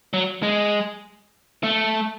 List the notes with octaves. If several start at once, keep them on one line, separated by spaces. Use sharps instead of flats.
F#3
G#3
A3